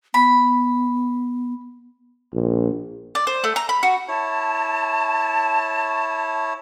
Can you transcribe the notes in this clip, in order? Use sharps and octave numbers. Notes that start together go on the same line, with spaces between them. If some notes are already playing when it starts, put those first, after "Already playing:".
B3 B5
A#1
D5
C5
A3
A#5
B5
F#4
E4 C#5 A5